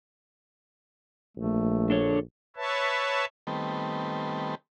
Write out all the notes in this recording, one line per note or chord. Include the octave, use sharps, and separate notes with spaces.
A#1 A3
D4 A4 C#5
B4 C#5 E5 A5
D#3 G3 A3 B3 C4